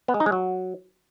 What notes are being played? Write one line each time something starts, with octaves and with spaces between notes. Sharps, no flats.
B3
G#3
D#4
G#3
F#3